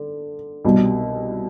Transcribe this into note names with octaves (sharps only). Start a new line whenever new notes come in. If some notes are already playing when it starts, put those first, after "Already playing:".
Already playing: D3
C2 B2 G3